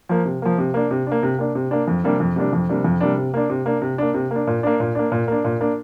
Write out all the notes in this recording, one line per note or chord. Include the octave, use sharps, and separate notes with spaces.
F3 A#3
C3
F3 A#3
C3
A#3 D4
C3
A#3 D4
C3
A#3 D4
C3
A#3 D4
F2
C3 G3 A#3 D4
F2
C3 G3 A#3 D4
F2
C3 G3 A#3 D4
F2
C3 G3 A#3 D4
C3
A#3 D4
C3
A#3 D4
C3
A#3 D4
C3
A#3 D4
A#2
A#3 D4
A#2
A#3 D4
A#2
A#3 D4
A#2
A#3 D4